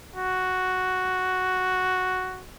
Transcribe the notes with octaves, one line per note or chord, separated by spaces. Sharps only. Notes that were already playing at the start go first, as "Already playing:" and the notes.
F#4